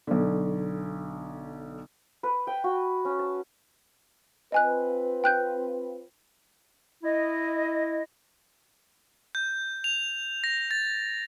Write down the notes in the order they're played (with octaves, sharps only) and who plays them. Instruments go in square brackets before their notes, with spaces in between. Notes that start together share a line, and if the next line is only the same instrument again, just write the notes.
[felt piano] B1 D3
[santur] B4
G5
F#4
C#4
A5
[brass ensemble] C4 F4 B4 [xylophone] D#5 G#5 F#6
[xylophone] G5 F#6 G6
[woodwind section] E4 D#5
[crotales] G6
F7
A#6
A6